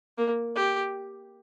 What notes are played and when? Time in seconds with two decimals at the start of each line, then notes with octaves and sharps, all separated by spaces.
0.18 A#3
0.56 G4